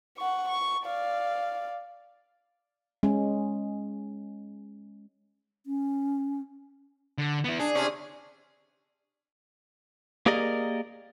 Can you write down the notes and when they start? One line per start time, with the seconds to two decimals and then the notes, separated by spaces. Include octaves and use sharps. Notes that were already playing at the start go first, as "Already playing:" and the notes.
0.17 F#5 C#6
0.48 C#6
0.85 D5 F5
3.03 G#3 C#4
5.66 C#4
7.18 D3
7.44 B3 E4
7.60 D4 G#4
7.75 C3 C#4 D4
10.26 A#3 G4 G#4 A#4 D5 D#5